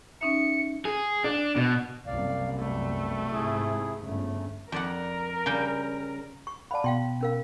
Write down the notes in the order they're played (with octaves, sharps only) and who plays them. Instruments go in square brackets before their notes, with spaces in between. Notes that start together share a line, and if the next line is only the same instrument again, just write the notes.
[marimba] C#4 D#4 E5 [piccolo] C#7
[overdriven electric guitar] G#4
D4
B2
[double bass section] F#1 C2 F#2 [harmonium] D5 F5
[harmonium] B2 G3 [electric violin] A3
[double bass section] G#2 [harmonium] C3 E4 G#4
[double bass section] G1 C#3 [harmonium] A3
[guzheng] F2 D5 F#5 [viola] A#4
[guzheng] C#3 G3 G5
[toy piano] C#6
[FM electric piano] D5 F5 F#5 [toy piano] A5 B5
[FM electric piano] B2 [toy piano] F5 G5 C6
[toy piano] C#4 A#4 F5